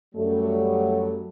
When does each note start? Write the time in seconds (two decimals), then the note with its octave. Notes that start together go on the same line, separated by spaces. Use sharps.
0.15 F#2 F#3 G3 A3